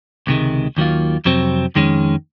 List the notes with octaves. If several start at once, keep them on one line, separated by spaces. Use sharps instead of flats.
C#2 C3 D#3 G#3
D#2 D#3 F#3 A#3 F4
F2 C3 F#3 C4
F2 D#3 G#3 C#4